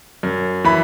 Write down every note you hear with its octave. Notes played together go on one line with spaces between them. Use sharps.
F#2
E3 B5